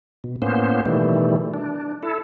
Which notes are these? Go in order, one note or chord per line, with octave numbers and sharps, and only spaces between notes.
B2
A2 A#3 B3 C#4 C5
B2 D#3 E3 G3 A3
D4
E4 A4